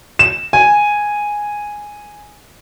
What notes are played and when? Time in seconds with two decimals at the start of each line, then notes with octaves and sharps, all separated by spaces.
0.19 E7
0.53 G#5